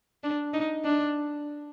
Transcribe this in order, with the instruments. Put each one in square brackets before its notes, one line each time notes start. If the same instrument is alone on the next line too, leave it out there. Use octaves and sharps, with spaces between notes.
[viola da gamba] D4
D#4
D4